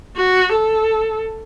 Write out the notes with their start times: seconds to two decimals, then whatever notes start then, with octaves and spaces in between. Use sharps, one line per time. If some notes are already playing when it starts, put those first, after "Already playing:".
0.16 F#4
0.52 A4